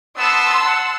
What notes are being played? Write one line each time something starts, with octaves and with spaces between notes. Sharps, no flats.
B3 A5 C6 E6
F#5